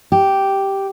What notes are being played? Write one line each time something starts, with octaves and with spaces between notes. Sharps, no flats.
G4